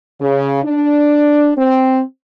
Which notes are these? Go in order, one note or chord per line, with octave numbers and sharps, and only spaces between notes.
C#3
D4
C4